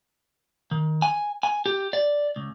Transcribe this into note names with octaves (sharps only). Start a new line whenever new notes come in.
D#3
G#5
G#5
G4
D5
C#2